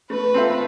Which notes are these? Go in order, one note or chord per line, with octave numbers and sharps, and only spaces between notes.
A3 B4
C4 F4 A4 E5